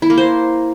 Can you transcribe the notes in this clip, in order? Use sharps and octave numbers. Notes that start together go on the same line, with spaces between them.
E4
A#3
C5